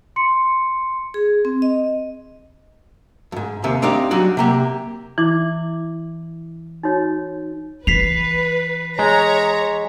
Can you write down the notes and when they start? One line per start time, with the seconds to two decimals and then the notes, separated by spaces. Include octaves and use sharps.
0.16 C6 C#7
1.14 G#4
1.45 C4
1.62 D#5
3.32 F2 G#2
3.64 D#2 C3 A#3
3.82 C4 D4 D#4 G4 F5
4.11 F#3 G3 D4 F#4
4.37 C3 A#3 G4
5.18 E3 E4 D6
6.83 D#4 F#4 C#5
7.87 E3 B4 B6 C7 F7
8.99 G#3 C#5 A#5